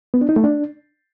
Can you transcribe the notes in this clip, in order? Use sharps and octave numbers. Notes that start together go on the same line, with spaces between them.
B3
D4
D#4
A3
D4